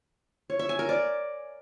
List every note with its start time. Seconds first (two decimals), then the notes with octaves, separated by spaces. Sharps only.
0.50 C#5
0.59 E5
0.69 G#5
0.79 A#4
0.89 D5